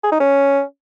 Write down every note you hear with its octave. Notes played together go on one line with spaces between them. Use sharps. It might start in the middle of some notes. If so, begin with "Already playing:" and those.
G#4
D#4
C#4